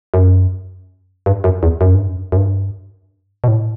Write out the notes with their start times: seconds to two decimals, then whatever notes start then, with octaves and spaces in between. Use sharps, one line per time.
0.14 F#2
1.26 G2
1.44 F#2
1.63 E2
1.81 F#2
1.95 G2
2.07 F#2
2.32 F#2
2.37 G2
3.44 B2
3.48 A2